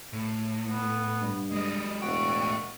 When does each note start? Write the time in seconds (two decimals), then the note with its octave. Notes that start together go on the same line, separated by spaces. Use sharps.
0.13 A2
0.68 B3
1.22 G2
1.52 G#3 G4 D#5
2.02 E1 A2 F#4 G5